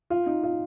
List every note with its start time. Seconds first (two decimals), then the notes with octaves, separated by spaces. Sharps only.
0.10 F4
0.26 D#4
0.43 F4